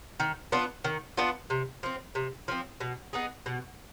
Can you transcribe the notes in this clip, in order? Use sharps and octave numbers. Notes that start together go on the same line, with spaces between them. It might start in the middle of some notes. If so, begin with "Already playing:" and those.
D#3
B3 D4 F4
D#3
B3 D4 F4
C3
F3 C4
C3
F3 C4
B2
B3 D#4 G#4
B2